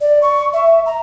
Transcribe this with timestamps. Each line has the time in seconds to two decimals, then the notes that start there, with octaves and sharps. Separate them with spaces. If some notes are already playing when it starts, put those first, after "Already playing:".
0.01 D5
0.22 C#6
0.53 E5
0.86 A#5